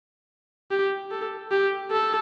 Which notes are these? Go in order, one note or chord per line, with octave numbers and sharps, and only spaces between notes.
G4
A4
G4
A4